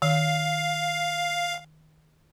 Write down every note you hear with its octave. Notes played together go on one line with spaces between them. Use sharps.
D#3 F5